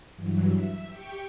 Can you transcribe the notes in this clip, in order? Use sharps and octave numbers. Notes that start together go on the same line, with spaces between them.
G2 E3 F#3
E5
G4 G5 C#6